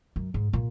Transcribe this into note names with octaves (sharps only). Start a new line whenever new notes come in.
F#2
G#2
A#2